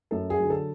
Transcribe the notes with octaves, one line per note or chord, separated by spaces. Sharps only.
F#2 A4
G#4
D3 F#3
A4